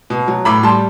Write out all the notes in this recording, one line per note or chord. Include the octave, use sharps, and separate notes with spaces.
B2
F#3
A2 B5 D6
G3 A5 C6